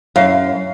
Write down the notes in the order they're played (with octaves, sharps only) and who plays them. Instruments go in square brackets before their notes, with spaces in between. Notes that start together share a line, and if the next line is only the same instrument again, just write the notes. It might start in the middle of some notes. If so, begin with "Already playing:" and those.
[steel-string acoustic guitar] F#2 [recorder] F5